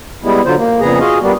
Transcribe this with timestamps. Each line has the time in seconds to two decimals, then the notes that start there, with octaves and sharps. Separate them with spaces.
0.24 G3 G#3 B3 E4
0.46 D3 F#3 F4 C5
0.58 A#3
0.80 F2 A#2 C#3 B3 G#4 A#5
1.00 F4 F#4 G#4 D#5 F5
1.22 G3 A#3 B3 D4